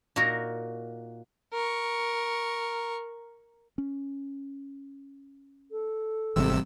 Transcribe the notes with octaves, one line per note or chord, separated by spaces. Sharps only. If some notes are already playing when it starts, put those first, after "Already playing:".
A#2 D#4 F#4 A#4
A#4 C#6
C#4
A4
G#1 C3 E3 G3 C4 E6